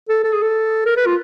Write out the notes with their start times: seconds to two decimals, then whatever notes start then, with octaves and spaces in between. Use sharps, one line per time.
0.09 A4
0.24 A4
0.33 G#4
0.42 A4
0.86 A#4
0.97 B4
1.06 F4